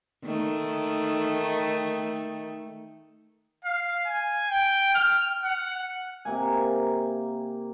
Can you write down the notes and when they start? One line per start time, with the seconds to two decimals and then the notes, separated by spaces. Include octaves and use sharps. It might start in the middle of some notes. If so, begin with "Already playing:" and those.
0.24 D#3 A3
3.65 F5
4.06 G#5
4.50 G5
4.95 F6
5.43 F#5
6.25 C3 A#3 G#5